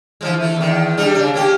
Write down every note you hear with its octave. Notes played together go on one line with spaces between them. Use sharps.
E3 F3 G#3
E3 A3
E2 D#3
G3 D4 G#4
C#3 D4
A#3 C#4 G4